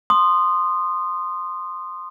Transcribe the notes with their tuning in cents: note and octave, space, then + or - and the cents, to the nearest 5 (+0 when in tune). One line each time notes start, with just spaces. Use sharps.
C6 +0 D#6 -20